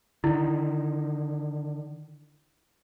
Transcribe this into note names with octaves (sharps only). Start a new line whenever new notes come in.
D3 D#3 E4